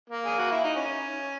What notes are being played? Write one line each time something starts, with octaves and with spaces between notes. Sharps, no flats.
A#3
G#4
F#4
E4
D#4
C#4